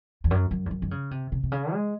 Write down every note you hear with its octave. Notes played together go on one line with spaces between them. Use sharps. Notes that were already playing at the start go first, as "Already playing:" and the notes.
E2
F#2
F#2
E2
F#2
D#3
C#3
C3
C3
C3
C#3
G#3